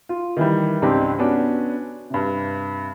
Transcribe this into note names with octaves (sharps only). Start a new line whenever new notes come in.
F4
D#3 E3 G3
C#2 G#2 C4 D4 G4
B3 C#4 D4 F#4
G2 C3